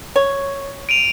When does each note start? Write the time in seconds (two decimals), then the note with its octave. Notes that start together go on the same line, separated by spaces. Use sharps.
0.16 C#5
0.89 D7 D#7 F7